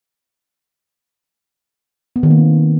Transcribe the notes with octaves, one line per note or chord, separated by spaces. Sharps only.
B3
D#3
A#3
C4